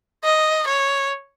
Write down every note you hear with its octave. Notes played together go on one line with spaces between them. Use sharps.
D#5
C#5